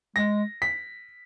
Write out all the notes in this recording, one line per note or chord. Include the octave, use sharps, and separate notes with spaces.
G#3 A#6
B6